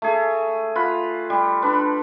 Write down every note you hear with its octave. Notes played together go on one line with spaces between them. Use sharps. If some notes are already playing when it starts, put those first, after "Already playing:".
A3 G#4
F4 F#5 B5
G3
D4 B4